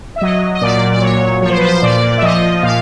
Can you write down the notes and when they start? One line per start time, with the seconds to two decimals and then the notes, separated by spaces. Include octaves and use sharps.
0.16 E5
0.21 F#3 D#5
0.55 D#5
0.61 A#2 D5
0.92 D5
1.01 F#3 C#5
1.41 F3 C#5
1.50 C5
1.57 B4
1.65 C5
1.82 A#2 D5
2.18 E5
2.22 F3 D#5
2.63 A#2 F5